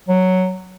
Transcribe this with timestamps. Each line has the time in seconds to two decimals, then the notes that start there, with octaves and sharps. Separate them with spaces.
0.09 F#3